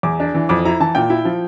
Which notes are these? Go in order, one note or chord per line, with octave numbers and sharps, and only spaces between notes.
E2 D6
D4
E3
F2 D6
E4 A#5
E3 A5
A#2 G5
E4
F3